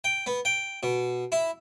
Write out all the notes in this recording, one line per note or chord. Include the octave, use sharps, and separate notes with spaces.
G5
B3
G5
B2
E4